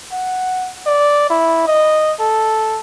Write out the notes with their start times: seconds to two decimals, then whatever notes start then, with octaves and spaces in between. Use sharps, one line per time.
0.12 F#5
0.86 D5
1.30 E4
1.68 D#5
2.20 A4